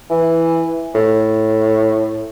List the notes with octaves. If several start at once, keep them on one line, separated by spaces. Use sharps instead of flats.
E3
A2